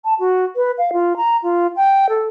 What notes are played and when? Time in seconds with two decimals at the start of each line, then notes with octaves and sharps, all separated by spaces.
0.05 A5
0.20 F#4
0.56 B4
0.78 F5
0.93 F4
1.17 A#5
1.43 F4
1.76 G5
2.09 A4